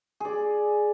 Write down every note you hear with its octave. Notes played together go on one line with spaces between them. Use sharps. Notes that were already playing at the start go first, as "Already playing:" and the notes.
G#4 D5